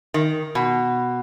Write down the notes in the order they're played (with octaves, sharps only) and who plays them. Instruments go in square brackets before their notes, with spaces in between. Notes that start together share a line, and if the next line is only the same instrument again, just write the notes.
[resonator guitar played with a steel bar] D#3
B2